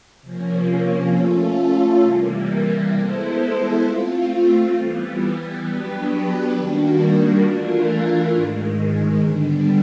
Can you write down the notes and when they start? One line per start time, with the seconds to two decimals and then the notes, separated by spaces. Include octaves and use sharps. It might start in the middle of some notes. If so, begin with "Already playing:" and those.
0.22 C3 F3 A#3 C#4
1.12 A3 C#4 F4 A4
2.02 C3 E3 G3 A#3
2.92 G#3 B3 E4 A4 C5
3.82 A3 C4 F4
4.72 E3 G3 B3
5.62 F#3 B3 D4 G4 B4
6.52 D#3 G3 A#3 D4 F#4
7.42 E3 A3 D4 F4 A#4
8.31 G#2 D#3 G#3
9.22 D3 G3 B3 D4